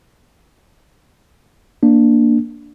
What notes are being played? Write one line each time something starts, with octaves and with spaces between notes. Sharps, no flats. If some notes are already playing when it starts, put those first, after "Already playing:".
A#3 D4